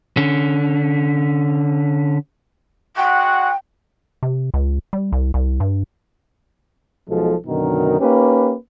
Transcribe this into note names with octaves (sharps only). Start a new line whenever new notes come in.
D3 C#4
G#3 F#4 F#5 G5
C3
C#2
G3
C2
C2
G2
B1 B2 F3 G#3 A4
F#2 B2 D3 D#3 D#4 A#4
A#3 C#4 D#4 G4 B4